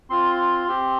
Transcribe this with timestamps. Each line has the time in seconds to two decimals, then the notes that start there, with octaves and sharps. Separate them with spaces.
0.10 C4 F4 C6
0.68 C4 G4